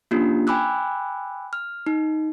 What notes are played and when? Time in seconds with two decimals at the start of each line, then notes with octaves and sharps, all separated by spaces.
0.11 A#3 C#4 D4 F4 G4
0.47 G5 G#5 B5 D6 E6 F#6
1.53 F6
1.86 D#4